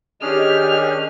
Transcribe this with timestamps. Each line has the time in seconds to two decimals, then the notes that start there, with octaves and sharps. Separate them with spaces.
0.22 D#3 C#4 D4 G4 G#4 D#5 F6